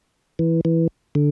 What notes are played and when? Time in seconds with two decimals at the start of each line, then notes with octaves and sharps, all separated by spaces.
0.39 E3
0.65 E3
1.15 D3